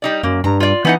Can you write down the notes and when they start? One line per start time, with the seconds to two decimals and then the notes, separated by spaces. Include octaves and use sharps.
0.02 G3 D#4 D5
0.23 F#2 A#3
0.44 G2 A#5
0.60 F4 D5
0.85 E3 B3 D#4 F#5